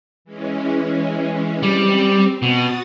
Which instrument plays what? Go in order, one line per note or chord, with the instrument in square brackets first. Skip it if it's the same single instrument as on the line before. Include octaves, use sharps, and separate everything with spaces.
[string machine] E3 G#3 C#4
[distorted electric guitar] G3 [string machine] C4
[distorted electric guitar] B2 [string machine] F#4 D#6 A6